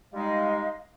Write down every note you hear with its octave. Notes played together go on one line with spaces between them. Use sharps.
G3 G#3 D#4 D#5 F5